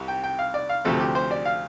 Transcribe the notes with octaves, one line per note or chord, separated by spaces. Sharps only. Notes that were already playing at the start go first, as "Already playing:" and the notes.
Already playing: C2 C3
G5
G5
F5
D5
F5
D2 C3 F3 A3 C4 A4
G4
C5
D5
F5